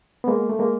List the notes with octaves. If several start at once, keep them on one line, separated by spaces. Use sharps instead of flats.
B3
G#3 A#3
A3
G#3 A#3